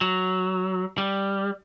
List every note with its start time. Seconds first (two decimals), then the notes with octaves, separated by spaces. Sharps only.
0.01 F#3
0.98 G3